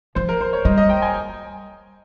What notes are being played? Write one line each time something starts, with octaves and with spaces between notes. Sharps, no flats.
F3 C5
A#4
C5
C#5
G3 D#5
D#5
G5
G#5